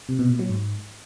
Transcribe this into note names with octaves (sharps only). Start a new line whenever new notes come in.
C3
B2
A#2
F#3
G#2